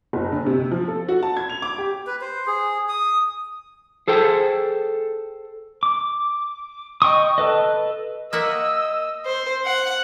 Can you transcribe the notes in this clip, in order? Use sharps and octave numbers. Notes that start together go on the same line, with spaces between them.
F#1
D3
C3
F3
A4
F#4
A5
G#6
F7
D6
G4
B4
C5
G#4
D#6
G#4 A4 C5 G5
D6
D#5 G5 C#6 D#6
A4 B4 D#5
A#3 D#5 E5 F#5 E6
C5
F#5